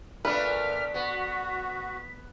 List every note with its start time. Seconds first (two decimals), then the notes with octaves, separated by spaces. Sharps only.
0.25 A#2 A3 B3 D4 B4 F6 B6
0.94 B3 F#4